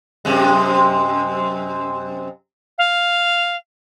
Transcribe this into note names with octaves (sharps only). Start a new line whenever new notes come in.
F#2 C3 G#3
F5